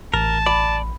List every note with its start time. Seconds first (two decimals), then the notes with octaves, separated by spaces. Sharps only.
0.14 A1 A#4 A5
0.46 D5 B5